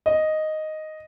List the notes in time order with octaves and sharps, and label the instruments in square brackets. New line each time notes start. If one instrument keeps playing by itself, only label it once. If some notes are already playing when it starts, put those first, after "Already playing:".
[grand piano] D#5